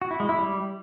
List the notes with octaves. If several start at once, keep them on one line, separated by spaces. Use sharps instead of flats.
F#4
E4
G#3
E4
G3